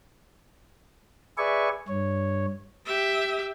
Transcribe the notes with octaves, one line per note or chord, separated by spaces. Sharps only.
G#4 B4 D5 E5 G#5 C#6
G2 C#5
G4 E5